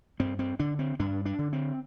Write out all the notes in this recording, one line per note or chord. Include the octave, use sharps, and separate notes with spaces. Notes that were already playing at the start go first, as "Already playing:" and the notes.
G2 C4
C4
D3 D4
C4
G2 D4
D4
D3
C4